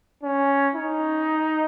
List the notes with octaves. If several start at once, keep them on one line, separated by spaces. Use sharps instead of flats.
C#4
D#4